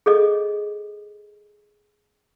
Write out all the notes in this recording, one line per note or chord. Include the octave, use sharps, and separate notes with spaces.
G#4 A4 D#5